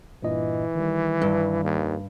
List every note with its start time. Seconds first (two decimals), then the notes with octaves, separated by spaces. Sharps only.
0.23 G2 A#2 E3 D#5
0.75 D#3 G3
1.22 G2
1.64 D#2